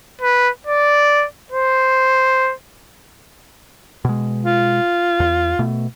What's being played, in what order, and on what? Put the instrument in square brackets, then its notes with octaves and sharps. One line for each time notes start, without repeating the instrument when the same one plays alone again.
[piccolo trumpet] B4
D5
C5
[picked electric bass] B2 G#3
[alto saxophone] F4
[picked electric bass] E2
B2 A3